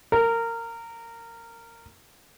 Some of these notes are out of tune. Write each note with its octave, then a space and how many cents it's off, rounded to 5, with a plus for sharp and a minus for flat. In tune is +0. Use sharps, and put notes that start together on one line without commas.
A#4 -20